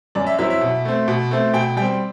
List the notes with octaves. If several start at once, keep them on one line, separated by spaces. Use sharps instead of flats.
F#2 D5
E5
F#3 C4 E4 E5
E5
B2
A3 C4
B2
A3 C4
B2 G5
G3 G5
C4